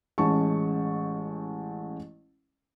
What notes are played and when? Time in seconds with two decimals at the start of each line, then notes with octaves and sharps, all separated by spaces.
0.18 A1 G#3 C#4 A5 C#6